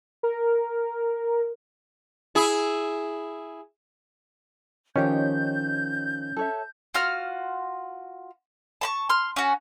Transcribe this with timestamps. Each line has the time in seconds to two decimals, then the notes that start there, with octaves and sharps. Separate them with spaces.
0.23 A#4
2.35 E4 G#4
4.96 D#3 F3 C#4 D#4 G4 C#5 G6
6.37 A4 C#5 E5
6.94 F4 F#4 F6
8.81 A5 B5 C#6
9.09 C6 F6
9.36 C#4 F#4